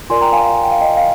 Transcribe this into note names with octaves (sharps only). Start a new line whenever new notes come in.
F4 A#4 D5 G#5 C6
G5 A#5
F5 G#5
F5
G#5
G5
F5
D#5 G5
F5